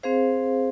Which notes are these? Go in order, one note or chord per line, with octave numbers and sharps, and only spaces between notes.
C4 G#4 C5 F5